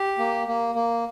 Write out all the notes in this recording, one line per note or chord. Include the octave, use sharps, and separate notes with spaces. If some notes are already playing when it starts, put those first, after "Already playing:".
Already playing: G4
A#3
A#3
A#3